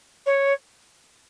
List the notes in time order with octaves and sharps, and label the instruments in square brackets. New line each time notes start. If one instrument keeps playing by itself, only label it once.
[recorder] C#5